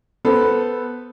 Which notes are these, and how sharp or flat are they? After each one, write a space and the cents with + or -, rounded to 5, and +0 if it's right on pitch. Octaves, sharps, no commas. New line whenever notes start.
B3 +0 A4 +0 C5 -15